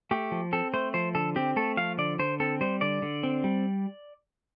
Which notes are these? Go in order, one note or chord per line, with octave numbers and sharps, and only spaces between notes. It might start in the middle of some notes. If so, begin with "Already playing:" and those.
A3 G4
F3
C4 A4
A3 C5
F3 C5
D3 A4
C4 G4
A3 A4
F3 F5
D3 D5
D3 C5
C4 A4
G3 C5
D3 D5
D3
C4
G3